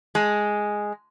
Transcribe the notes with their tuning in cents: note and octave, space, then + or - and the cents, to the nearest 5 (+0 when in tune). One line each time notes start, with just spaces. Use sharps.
G#3 +0